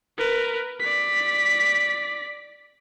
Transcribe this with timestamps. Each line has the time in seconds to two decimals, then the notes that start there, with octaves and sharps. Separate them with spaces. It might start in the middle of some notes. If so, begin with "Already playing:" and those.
0.17 A#4 B4
0.79 D5 B6